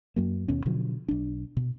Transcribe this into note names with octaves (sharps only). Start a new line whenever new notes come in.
F#2 F#3 A#3
D#2 B2 C#4
B2 D3 F3 F#3
B1 D4
B2